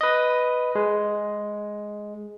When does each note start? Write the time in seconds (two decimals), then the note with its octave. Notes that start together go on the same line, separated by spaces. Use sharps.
0.01 B4 D#5
0.75 G#3